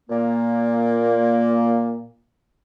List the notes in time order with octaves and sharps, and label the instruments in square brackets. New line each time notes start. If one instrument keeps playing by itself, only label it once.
[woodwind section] A#2 A#3